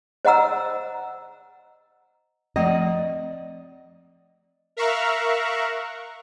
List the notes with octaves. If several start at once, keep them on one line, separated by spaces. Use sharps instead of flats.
C5 D#5 F#5 A#5 E6
F3 A3 C4 D5 D#5
A#4 E5 F5 A#5 C#6 F#6